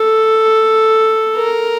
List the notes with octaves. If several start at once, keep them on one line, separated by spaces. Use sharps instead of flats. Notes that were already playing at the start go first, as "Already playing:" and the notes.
Already playing: A4
A#4